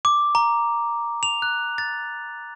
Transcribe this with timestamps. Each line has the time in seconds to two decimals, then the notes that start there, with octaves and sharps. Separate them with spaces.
0.05 D6
0.35 A#5
1.23 F7
1.42 F#6
1.78 A6